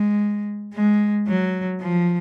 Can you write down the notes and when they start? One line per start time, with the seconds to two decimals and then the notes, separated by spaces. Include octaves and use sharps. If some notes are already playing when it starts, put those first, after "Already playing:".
Already playing: G#3
0.74 G#3
1.27 F#3
1.81 F3